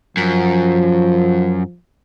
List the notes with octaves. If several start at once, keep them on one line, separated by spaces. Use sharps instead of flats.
F#2 F3